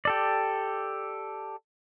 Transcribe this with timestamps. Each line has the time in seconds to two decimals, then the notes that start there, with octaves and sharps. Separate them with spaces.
0.05 G4 A4 D5